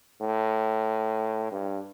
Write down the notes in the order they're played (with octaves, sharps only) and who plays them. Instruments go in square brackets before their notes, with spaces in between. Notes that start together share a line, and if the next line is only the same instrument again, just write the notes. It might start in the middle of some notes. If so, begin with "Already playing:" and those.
[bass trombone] A2
G2